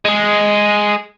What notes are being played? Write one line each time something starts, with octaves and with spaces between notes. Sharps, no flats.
G#3 G#4